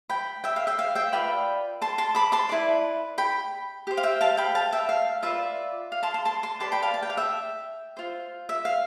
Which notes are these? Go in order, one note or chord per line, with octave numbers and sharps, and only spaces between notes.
G5 B5
E5 G5
F5
E5 G5
F5
E5 G5
F4 B4 D5 G5 B5
A5 C6
A5 C6
B5 D6
A5 C6
E4 B4 D5
G5 B5
G4 C5
F5
E5 G5
F5 A5
G5 B5
F5 A5
E5 G5
F5
F4 B4 D5 E5
F5
A5 C6
A5 C6
A5 C6
A5 C6
G4 B4 D5 A5 C6
G5 B5
F5 A5
A5
G5
F5
E5 G5
F4 C5
E5
F5